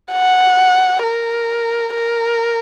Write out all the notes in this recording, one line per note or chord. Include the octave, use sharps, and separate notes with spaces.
F#5
A#4
A#4